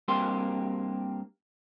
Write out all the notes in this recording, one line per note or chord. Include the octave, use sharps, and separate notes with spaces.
G2 A#3 C4 G4 C6